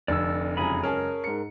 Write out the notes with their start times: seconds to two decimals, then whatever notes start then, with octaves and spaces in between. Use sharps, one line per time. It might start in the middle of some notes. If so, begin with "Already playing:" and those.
0.08 F1 F2 D3 D5 E6
0.57 C#2 F#2 G#4 A#5 B5
0.84 C#4 G#4 A#4 A5
1.24 G#2 C#7